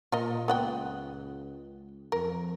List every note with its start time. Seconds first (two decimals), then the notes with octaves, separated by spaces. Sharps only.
0.12 A#2 F4 A#4 D#5
0.48 C#2 B3 F#5 G5
2.12 F2 A#4